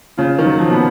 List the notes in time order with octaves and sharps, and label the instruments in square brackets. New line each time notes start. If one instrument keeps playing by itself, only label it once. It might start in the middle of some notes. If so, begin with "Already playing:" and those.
[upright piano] C#3 [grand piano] F4
[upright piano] D#3
[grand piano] F#3
[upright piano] F3
[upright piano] B2 [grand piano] B3